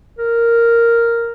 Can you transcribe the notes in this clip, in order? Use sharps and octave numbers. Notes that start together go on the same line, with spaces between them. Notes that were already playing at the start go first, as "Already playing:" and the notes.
A#4